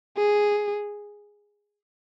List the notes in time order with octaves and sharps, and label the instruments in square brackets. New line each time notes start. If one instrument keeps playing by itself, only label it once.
[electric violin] G#4